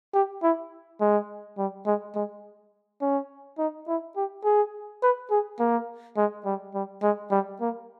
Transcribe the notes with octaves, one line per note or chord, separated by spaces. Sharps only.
G4
E4
G#3
G3
G#3
G#3
C#4
D#4
E4
G4
G#4
B4
G#4
A#3
G#3
G3
G3
G#3
G3
A#3